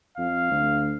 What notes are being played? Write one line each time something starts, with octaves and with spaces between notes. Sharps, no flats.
F2 F5
D2